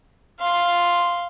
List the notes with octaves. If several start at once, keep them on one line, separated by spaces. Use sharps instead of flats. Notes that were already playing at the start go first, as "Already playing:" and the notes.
F5 C6